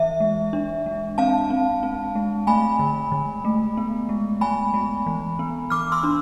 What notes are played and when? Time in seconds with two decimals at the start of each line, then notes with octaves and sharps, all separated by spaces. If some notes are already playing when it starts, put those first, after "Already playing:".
Already playing: E3 E5
0.20 G#3
0.53 D4
0.86 G#3
1.18 C4 F5 A5
1.50 C4
1.83 C4
2.15 G#3
2.47 A3 G#5 B5
2.79 D3
3.12 D3
3.45 A3
3.77 B3
4.09 G#3
4.41 G#3 G#5 B5
4.74 G#3
5.06 E3
5.39 B3
5.70 E3 D6 F6
5.92 C6 E6
6.03 D4